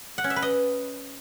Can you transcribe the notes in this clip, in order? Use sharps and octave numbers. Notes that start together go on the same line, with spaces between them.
F#5
C#4
E5
B4
D#5